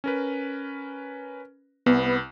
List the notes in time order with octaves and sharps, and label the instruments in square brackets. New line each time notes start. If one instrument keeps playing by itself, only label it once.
[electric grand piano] C#4 A#4 B4
[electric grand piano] C2 [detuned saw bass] B3